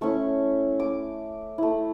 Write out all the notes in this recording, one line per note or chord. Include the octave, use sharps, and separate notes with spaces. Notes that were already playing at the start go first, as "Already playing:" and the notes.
A3 C#4 E4 C#6
D6
A3 E4